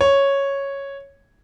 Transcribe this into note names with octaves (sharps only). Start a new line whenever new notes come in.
C#5